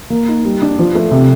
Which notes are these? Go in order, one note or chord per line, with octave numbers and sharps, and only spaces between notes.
A#3
D#4
G3
D4
F3
A3
C3